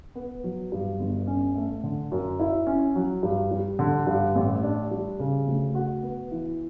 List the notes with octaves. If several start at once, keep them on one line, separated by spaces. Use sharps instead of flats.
B3
F#3
G2
G1
C#4
A3
D3
F#2
E4
C#4
F#3
G2
G3
D3
G2
A1
D4
G3
C#3
D2
F#4
B3
E3